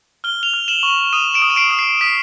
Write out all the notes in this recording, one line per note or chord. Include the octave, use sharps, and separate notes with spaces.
F6 G7
F7 G7
F6
E7 F#7
C#6
D#6 D#7 F7
D7 E7
D#6
D#7
C7 D7
D#6
C7
D#6 B6